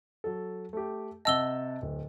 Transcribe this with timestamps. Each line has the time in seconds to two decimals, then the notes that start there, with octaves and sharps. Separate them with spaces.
0.24 F#3 A4
0.73 A3 G4
1.25 C3 D#5 F#5 A5 E6 G7
1.82 D1